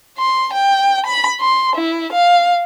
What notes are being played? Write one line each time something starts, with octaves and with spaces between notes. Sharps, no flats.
C6
G5
B5
C6
E4
F5